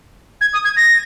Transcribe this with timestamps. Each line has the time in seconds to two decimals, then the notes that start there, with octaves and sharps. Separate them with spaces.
0.41 G#6
0.54 D#6
0.64 G#6
0.77 A#6